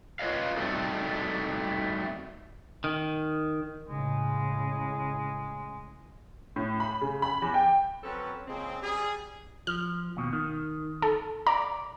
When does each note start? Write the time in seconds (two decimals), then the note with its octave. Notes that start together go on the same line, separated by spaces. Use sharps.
0.19 F4 B4 C#5 D#5 F5
0.57 G3 A3 C4 D#4 F#4 A4
2.84 D#3
3.88 A2 C#3 G#3
6.56 A2
6.80 B5
7.01 C#3
7.22 B5
7.42 E2
7.54 G5
8.03 F#3 C4 C#4 A4 B4
8.48 A#2 C#3 G#3 C4
8.82 G3 G#4
9.67 F3 F6
10.17 D#2 B2
10.33 D#3
11.02 A4
11.47 D5 A#5